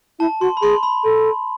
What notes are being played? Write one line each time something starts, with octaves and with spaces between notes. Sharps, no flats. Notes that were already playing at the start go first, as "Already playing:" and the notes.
E4 A5
F#4 C6
B5
G#4 C6
B5
A4